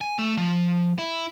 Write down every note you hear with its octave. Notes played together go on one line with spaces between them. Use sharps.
G#5
A3
F3
E4